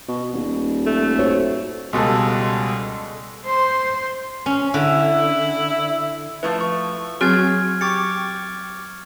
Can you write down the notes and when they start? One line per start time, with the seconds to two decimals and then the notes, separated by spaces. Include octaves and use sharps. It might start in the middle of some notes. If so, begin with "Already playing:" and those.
0.08 B2
0.33 D#1
0.87 A3
1.19 F#4 C5 C#5
1.93 C#2 B2 G3 G#3 A4
3.46 C5 C6
4.46 C#4
4.74 D3 E4
6.43 F3 A3 E4 B4
6.61 C#6
7.21 F#3 C4 F#4 G#4 C#5 F6 G#6
7.81 G4 C#6 D6 A6 C#7